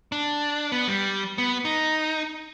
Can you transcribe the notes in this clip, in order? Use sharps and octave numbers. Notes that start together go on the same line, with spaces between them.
D4
B3
G3
B3
D#4